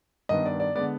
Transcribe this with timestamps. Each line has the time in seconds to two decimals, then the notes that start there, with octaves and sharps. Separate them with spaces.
0.29 G2 D#3 B3 D#5
0.45 D5
0.60 D5
0.75 D3 G#3 B3 D5